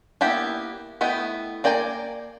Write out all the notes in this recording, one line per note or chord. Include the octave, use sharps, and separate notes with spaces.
A#3 B3 E4 G4
A3 B3 E4 D#5 G5
A#3 D5 G5 G#5 A#5